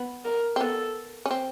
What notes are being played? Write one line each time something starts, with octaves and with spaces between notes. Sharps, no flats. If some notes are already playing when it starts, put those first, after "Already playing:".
Already playing: B3
A#4
C4
B3 A4
C#4
C4